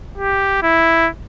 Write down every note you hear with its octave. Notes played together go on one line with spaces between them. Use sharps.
G4
E4